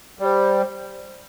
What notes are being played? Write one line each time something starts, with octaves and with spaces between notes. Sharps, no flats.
G3 D5
C5